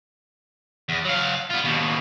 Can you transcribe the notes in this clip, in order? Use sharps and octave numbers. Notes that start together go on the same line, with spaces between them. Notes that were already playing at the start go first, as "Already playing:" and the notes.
E2
F#3 F5
B3 F4
D#2 B2